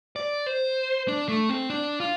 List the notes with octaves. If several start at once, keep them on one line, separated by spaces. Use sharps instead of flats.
D5
C5
D4
A3
C4
D4
F4